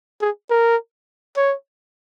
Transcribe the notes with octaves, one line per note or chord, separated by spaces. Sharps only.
G#4
A#4
C#5